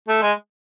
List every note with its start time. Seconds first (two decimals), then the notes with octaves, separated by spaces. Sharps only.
0.08 A3
0.22 G#3